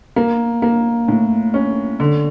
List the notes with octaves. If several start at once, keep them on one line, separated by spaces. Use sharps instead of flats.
A#3
A#3
A2
C#4
D3